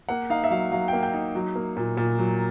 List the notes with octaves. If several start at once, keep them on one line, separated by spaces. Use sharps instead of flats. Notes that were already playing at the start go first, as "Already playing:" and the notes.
A#3 F#5
D#4 F5
E5
F#3 F5
F#3 F5
G5
A#3
G5
D#4
F#3
A#3
A#2
A#2
F#3